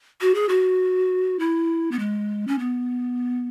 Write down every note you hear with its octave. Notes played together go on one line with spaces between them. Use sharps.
F#4
G#4
F#4
E4
B3
G#3
C#4
B3